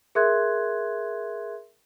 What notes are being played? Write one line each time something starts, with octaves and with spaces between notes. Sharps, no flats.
G#4 A#4 E5 C6 F#6 G#6